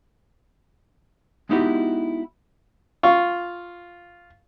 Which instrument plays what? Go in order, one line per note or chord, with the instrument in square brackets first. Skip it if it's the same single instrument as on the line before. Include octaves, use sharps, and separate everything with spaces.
[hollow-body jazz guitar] G#3 B3 D#4 E4 F#4 G4
[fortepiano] F4 C#6